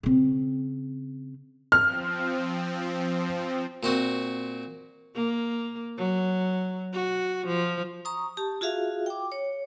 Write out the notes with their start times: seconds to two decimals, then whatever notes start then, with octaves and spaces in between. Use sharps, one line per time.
0.03 C#3 C4
1.72 F3 C4 F6
3.83 A#2 C4 F#4
5.15 A#3
5.98 F#3
6.93 F#4
7.48 F3
8.05 A#5 C#6 D#6
8.37 G4 A5
8.61 F4 F#4 G#4 E5 F5
9.06 G5 D6
9.32 C#5